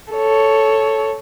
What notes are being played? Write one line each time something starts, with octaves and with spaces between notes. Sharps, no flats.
A4 C#5